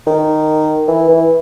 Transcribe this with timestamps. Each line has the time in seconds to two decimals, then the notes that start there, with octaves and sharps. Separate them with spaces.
0.07 D#3
0.88 E3
1.09 E3